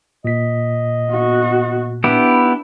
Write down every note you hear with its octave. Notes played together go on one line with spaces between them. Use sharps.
A#2 D#5 B6
B3 F#4
B3 D4 E4 G4